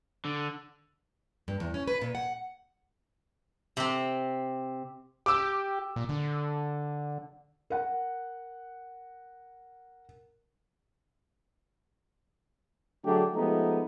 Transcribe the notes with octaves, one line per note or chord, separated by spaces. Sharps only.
D3
G2
E2
C#4
B4
A#2
F#5
C3 C4
G4 D6 E6
A#2
D3
A#4 F#5
D3 F#3 A3 D4 G4 G#4
F3 G#3 A3 B3 D#4 G4